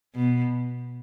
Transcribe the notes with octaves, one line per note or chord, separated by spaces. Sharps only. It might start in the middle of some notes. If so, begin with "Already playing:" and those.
B2